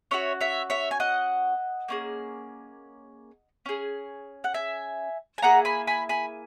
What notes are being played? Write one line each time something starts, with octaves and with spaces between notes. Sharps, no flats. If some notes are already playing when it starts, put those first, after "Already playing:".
C#4 F#4 C#5 E5
C#5 E5
C#5 E5
G#5
D#5 F#5
A#3 C#4 G#4
C#4 G#4
F#5
E5 G#5
G#5
A#3 E4 G#4 F#5 A#5
G#5 B5
G#5 B5
G#5 B5